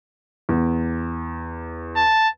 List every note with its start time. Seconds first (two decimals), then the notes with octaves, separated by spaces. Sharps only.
0.49 E2
1.96 A5